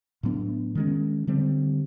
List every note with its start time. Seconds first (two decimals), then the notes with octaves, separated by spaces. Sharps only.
0.23 A2 F#3 B3 D4
0.75 D#3 G#3 C#4
1.27 D3 G3 C4